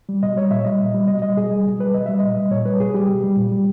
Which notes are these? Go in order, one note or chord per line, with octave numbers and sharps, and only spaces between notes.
G3
B2 D#5
G3 C#5
A#2 E5
G3 D#5
A#2
G3
B2 D#5
G3 D#5
B2 G#4
G3
B2
G3 B4
B2 D#5
G3 E5
A#2 D#5
G3
A#2 C#5
G3 B4
B2 G#4
G3 G4
B2
G3
A#2
G3